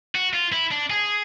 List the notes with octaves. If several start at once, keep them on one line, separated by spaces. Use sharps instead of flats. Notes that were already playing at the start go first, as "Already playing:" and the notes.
F#4
F4
E4
D4
G#4